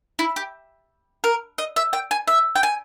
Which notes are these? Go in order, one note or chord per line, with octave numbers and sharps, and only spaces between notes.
E4
G4
A#4
D#5
E5
G5
G#5
E5
G5
G#5